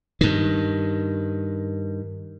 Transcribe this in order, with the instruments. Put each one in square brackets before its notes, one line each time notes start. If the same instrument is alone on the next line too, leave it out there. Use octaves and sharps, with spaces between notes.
[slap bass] G2 D#3